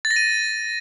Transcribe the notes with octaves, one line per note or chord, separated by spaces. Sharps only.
A6
A#6
D#7